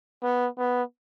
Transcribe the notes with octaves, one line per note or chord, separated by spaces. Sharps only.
B3
B3